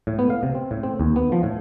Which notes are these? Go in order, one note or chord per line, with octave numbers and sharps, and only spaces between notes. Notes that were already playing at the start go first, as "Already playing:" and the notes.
A2
B3
F5
C3
C4
A2
C4
D#2
B3
F3
A2